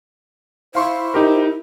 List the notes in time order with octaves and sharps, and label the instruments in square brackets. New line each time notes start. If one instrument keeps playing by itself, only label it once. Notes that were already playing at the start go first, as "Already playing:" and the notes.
[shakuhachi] E4 [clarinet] C5 [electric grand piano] F5 C6 C#6
[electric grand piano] D#4 G4 A#4